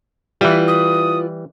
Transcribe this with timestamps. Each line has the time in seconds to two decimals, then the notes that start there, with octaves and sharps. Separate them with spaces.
0.41 E3 G3 E4 F4 B4
0.68 D#6